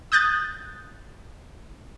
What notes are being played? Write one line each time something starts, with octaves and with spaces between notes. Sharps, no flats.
D#6 F#6 G6 A6